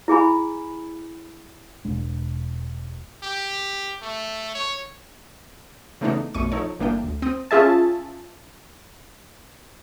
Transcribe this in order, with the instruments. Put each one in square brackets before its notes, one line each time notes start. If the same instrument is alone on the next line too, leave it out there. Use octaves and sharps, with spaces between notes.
[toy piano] E4 G#4 G#5 B5
[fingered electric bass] E1 G#3 D4
[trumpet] G4
A3
C#5
[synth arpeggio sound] C#3 E3 A3 B3 D4 D#4
B1 F2 A3 C#6 D#7
F3 D#4 A4 C#5
G1 E3 A#3 D4 G5
D2
C4 D#6
[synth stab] C#4 F4 G#4 E5 A5